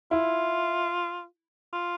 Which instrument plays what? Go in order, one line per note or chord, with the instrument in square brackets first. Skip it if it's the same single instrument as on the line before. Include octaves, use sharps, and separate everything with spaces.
[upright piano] E4 [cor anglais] F4
[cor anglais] F4